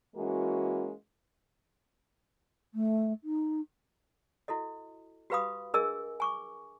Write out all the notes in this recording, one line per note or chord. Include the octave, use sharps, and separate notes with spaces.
E3 G#3 A#3 C#4 F#4
A3
D#4
E4 F#4 A4 D#5
F#4 G4 B4 F5 B5 D#6
D4 G#4 A#4 D#5 G#5 E6
G#5 C#6 D6